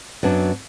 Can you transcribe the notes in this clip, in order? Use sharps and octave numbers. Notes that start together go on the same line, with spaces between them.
F#2 F#3 B3 D4